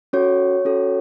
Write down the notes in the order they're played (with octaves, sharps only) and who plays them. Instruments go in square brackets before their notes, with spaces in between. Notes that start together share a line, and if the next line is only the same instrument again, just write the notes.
[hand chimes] C#4 F#4 A4 C#5
C#4 F#4 A4